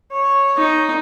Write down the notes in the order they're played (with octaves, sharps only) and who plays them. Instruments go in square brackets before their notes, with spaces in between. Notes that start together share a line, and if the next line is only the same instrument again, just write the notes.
[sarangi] C#5
[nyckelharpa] D#4